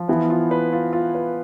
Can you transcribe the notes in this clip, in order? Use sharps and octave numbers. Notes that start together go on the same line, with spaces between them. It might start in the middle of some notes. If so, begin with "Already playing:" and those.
Already playing: F3
E3 B3
F4
B4
F4
F4
B4